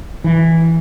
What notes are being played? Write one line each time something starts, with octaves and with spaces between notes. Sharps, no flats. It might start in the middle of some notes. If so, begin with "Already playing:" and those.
E3